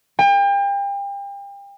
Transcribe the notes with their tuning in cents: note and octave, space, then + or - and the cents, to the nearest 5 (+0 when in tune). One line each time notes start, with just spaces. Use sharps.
G5 +35